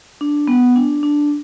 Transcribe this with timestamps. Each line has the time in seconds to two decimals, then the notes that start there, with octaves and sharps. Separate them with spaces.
0.21 D4
0.48 B3
0.76 D4
1.03 D4